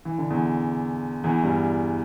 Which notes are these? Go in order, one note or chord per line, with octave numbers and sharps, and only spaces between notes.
E3
D3
E2 E3
E2 E3
G2 G3